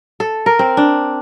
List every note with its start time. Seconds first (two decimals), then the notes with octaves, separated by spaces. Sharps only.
0.20 A4
0.46 A#4
0.59 C4
0.77 D4